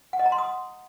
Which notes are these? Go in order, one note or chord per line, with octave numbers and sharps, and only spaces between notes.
F#5
D#5
A#5
C6
D#6